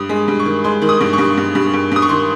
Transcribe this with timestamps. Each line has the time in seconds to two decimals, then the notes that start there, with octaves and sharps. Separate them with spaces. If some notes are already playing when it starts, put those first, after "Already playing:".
Already playing: G2 D#6
0.09 G#3
0.28 G2
0.39 C#6
0.45 D#3
0.64 G#3 C6
0.82 D#3
0.89 D#6
1.01 G2
1.13 C#6
1.18 G2
1.37 G2
1.55 G2
1.74 G2
1.92 G2 D#6
2.02 C#6
2.09 D#3 C6